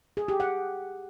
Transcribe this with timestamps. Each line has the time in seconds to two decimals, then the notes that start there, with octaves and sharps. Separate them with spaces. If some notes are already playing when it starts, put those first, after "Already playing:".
0.17 G#4
0.28 G4
0.40 F#5